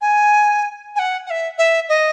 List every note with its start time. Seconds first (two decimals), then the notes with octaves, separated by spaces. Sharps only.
0.01 G#5
0.95 G#5
0.99 F#5
1.26 F#5
1.30 E5
1.58 E5
1.89 D#5